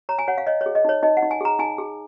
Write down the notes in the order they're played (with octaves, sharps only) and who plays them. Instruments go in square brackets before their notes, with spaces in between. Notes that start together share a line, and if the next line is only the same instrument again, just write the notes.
[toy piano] C#5 A#5
G#5
C#5 F#5
F5
C#5 D#5
C#5
G#4
D#5
D#4 C#5
D#4 D#5
F#5
D#4
G#5
G#4 A#5
D#4 G#5
G#4